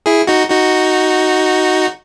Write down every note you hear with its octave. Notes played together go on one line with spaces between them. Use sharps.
E4 G#4
D#4 F#4
D#4 F#4